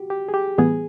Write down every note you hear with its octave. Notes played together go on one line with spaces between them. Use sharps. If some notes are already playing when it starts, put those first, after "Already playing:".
Already playing: F#4 G4
G4
G#4
G4
A2 E3 G3 B3 G#4